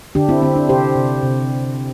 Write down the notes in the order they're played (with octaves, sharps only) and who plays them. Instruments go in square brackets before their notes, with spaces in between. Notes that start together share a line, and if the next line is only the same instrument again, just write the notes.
[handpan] D3 D4 G4
C4 E4
D3 C4
D4
C3 G4 C5
C3
C3